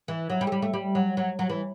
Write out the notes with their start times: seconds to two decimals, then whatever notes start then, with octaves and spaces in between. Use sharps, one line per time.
0.08 E3
0.30 F#3
0.41 G3
0.47 A3
0.52 G3
0.62 A3
0.74 G3
0.95 F#3
1.17 F#3
1.39 F#3
1.49 E3